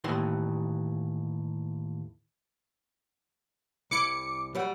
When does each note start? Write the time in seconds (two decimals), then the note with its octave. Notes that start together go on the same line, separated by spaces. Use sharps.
0.04 D#2 A2 E3 C6
3.91 C2 E4 D6 C#7
4.55 F#3 G3 F#5